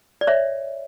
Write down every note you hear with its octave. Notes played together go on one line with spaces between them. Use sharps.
D5
C#5 E5